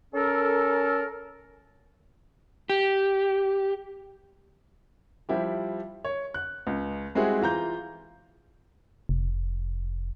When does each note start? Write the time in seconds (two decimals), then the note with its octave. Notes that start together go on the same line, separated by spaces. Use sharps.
0.13 C#4 A4 A#4
2.70 G4
5.29 F3 G3 E4 G4
6.04 C#5
6.34 F#6
6.67 C#2
7.15 G3 G#3 C4 E4 F#4 G#4
7.41 E3 F4 A#5 G6
9.09 F1